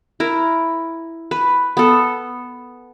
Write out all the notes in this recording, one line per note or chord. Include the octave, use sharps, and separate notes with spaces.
E4 A#4
B4
B3 A4